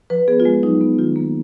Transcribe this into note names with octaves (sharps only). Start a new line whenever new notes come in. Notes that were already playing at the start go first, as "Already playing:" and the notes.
F3 B4
B3 G#4
F4
G#3
F#3 D#4
B3
D#3 F4
A#3